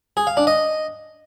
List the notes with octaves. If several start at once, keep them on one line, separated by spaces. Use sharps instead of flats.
G#4
F5
D4
D#5